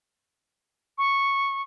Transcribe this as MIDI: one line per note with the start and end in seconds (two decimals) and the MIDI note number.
0.98 1.62 85